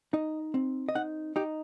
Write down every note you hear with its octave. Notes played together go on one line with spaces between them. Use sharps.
D#4 D#5
C4
D#5
D#4 F#5
D#4 G4